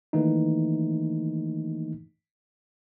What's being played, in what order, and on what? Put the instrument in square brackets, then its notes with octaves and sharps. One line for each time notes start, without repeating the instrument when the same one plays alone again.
[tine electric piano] D#3 E3 A3 A#3 D#4